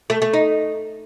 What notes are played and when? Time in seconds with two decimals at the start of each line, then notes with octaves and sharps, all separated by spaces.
0.10 A3
0.22 A3
0.34 D#4